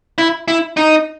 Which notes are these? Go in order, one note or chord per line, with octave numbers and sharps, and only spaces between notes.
E4
E4
D#4